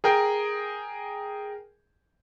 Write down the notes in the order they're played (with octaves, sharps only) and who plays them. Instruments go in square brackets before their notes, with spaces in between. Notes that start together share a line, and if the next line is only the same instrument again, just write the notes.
[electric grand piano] G#4 A#4 G5